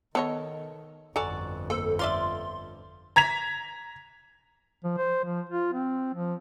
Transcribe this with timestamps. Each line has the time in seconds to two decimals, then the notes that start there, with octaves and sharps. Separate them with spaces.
0.15 D#3 B3 A4 C#5 D#5
1.16 G1 F2 F#4 A4 D5 G#5 A#5
1.70 A#3 A4 C5
1.99 F4 D5 E5 C6
3.16 A#5 G#6 B6 F7
4.84 F3
4.97 C5
5.24 F3
5.49 F4
5.73 C4
6.14 F3